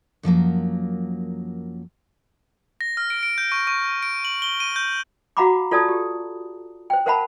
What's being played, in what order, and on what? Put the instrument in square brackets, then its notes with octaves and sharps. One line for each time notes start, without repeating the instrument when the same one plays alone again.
[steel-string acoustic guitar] F#2 F3 F#3 A#3
[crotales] A#6
F6
D7
D7
G6
C#6
C#6
D7
F#7
G7
D#7
G6
[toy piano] F#4 F5 F#5 A#5 B5 D6
F4 A4 D5 A5 D#6
G4
C5 G5
A#4 C5 F5 F#5 A5 B5